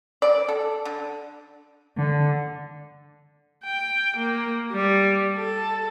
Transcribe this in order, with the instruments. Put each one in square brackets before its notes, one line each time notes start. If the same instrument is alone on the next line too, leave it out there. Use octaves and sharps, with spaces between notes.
[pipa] D5
A4
D3
[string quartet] D3
[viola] G5
A#3
G3
A4